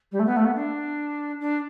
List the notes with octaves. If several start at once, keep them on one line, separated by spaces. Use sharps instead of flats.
G3
A3
B3
A3
B3
D4
D4